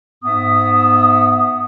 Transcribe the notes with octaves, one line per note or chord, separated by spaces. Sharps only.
G#2 B3 E5 D#6